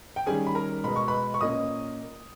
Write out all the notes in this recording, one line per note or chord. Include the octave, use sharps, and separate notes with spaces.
G5
D#3 G3 C#4 G#4 G#5
B5
A#4 A#5
B2 G#3 B3 B5
C#6
B4 B5
C#6
A#2 A#3 C#4 D#5 D#6